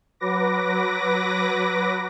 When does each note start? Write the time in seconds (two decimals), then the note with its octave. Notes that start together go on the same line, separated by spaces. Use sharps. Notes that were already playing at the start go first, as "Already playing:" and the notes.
0.20 F#3 B4 D6 A#6